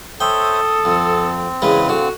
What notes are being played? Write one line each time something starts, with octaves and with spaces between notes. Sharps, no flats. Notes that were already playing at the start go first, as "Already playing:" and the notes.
A4 C5 C#5 E5 G5 D#6
F2 C4
E2 C#3 G#3 B4 C#5
D3 F#4 F5